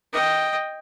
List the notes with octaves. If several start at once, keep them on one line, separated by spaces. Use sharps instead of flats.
D#5 G5